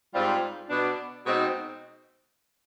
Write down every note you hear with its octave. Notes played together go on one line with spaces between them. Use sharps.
G#2 G3 C4 F4
B2 B3 D4
B2 G#3 C4 D#4